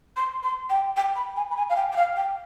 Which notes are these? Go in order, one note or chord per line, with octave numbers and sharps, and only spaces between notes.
C6
C6
G5
G5
B5
G#5
B5
G#5
F5
G5
G5
F5
G5